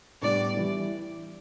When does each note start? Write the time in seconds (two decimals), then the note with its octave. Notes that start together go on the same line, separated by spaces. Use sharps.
0.22 A2 G3 B3 D4 D5
0.57 E3 G3 E4